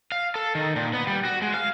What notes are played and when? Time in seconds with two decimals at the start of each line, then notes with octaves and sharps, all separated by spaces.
0.12 F5
0.35 A4
0.55 D#3
0.76 A#2
0.93 B3
1.07 G3
1.25 F#4
1.42 G#3
1.54 F5